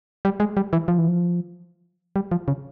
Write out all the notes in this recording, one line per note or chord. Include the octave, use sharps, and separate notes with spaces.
G3
G#3
G3
E3
F3
E3
F3
G3
F3
C#3